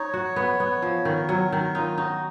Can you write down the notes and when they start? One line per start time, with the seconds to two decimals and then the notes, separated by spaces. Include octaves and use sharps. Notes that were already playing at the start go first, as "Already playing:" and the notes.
Already playing: D#4 C#5
0.14 F#4
0.36 B3
0.60 B3
0.82 F3
1.05 D#3 A#4
1.29 F#3
1.52 D#3
1.75 D#4 F4
1.98 D#4 F#4